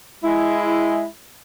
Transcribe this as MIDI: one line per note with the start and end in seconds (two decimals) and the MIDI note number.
0.24 1.04 56
0.24 1.04 64